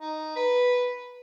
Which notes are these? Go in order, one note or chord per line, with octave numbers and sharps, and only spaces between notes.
D#4
B4